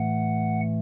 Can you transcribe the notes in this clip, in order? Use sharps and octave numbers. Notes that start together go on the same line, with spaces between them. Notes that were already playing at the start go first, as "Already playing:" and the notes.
Already playing: A2 E3 A3 F#5